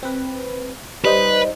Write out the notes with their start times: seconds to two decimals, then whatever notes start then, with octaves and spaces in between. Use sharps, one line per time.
0.03 C4 B4
1.05 G3 D#4 B4 C5